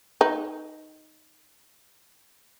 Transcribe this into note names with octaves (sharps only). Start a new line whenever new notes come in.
D#4 B4